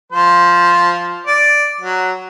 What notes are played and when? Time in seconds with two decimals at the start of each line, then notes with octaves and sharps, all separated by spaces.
0.13 F3 C5
1.27 D5
1.81 F#3